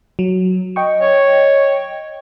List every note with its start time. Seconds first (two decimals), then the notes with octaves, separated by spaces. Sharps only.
0.19 F#3
0.76 D#5 G5 C#6
1.01 C#5